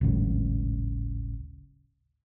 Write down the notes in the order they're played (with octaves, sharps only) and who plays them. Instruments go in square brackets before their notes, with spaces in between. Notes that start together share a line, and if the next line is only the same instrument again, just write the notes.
[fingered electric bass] D1 G#1 C#3